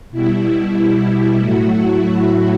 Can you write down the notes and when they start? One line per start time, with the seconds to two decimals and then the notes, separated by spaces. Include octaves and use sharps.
0.11 B2 G3 E4
0.44 E4
1.38 A2 F#3 A3 F#4
1.71 E4
2.03 F#4